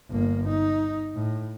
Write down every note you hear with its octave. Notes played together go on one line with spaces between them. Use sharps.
G1 A#3
D#4
A2